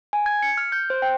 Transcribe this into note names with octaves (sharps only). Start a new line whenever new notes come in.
G#5
G#6
C#7
F6
G6
C5
G5